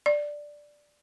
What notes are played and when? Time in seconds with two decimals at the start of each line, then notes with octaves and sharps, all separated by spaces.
0.06 D5